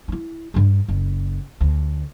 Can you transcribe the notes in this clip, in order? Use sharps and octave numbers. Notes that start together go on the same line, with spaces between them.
D#4 E4
G2 D4
F#1
D2